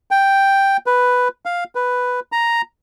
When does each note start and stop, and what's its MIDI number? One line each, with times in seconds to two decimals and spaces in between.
0.11 0.77 79
0.86 1.28 71
1.46 1.64 77
1.75 2.20 71
2.32 2.62 82